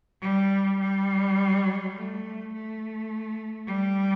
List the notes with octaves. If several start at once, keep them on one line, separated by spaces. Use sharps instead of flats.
G3
G3
A3
A3
G3